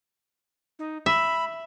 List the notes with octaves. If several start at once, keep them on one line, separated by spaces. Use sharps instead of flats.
D#4
E5 B5